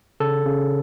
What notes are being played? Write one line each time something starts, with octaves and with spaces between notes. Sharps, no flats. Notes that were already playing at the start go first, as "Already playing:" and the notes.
C#3 A4
C#3